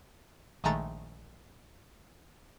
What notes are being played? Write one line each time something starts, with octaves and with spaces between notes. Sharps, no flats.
A#1 D#3 G#3 A3 A#5 A6